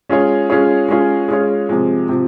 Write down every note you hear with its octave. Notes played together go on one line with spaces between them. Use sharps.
G#3 C#4 F4 G#4 C#5
G#3 C#4 F4 G#4 C#5
G#3 C#4 F4 G#4 C#5
G#3 C#4 F4 G#4 C#5
C3 F3 G#3
C3 F3